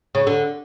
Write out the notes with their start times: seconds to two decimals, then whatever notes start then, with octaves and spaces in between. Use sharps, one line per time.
0.15 C#3
0.27 D3